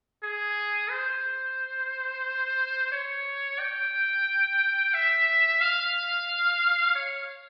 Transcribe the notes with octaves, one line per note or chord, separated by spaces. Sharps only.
G#4
C5
C#5
G5
E5
F5
C#5